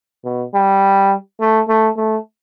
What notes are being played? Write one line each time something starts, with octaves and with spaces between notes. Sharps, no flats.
B2
G3
A3
A3
A3